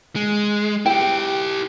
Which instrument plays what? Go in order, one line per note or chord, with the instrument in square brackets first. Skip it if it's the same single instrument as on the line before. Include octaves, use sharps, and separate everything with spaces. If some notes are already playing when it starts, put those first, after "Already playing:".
[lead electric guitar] G#3
[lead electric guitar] E4 G4 [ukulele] G5